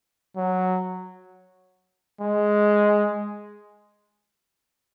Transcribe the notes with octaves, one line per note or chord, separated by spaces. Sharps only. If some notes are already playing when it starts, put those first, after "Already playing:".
F#3
G#3